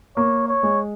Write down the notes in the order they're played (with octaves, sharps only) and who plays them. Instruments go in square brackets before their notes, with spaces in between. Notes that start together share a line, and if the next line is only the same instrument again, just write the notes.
[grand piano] A#3 [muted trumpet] C#5
[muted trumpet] C#5
[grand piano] G#3